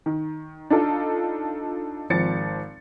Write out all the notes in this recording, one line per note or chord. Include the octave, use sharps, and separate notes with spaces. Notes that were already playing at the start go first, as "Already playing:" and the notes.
D#3
D4 D#4 F4 A4
G#1 F3 C4 A6 C#7